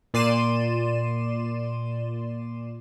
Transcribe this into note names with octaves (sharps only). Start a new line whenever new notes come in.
A#2 D5 C6 D#7 E7